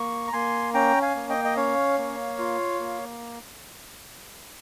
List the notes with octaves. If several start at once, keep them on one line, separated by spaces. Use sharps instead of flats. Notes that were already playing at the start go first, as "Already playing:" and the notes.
Already playing: A#3 C#6
A#5
A#3 G#5 C6
C#4 G5 A#5
F5 G#5
A#3
D#5 G5
D#5
C#4 C#5 F5
A#3
F4
A#3